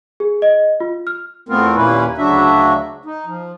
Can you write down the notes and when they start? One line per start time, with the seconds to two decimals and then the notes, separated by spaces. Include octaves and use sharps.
0.20 G#4
0.42 D#5
0.80 F4
1.07 F6
1.49 E2 A3 B3 C4 F4 A#4
1.76 D#2 A#2 A#3 C#4 E4 B4
2.18 D2 C#3 F#3 D4 F#4 E5
3.05 D#4
3.26 F3